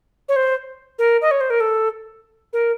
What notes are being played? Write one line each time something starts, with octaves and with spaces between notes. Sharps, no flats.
C#5
C5
A#4
D#5
C#5
C5
A#4
A4
A#4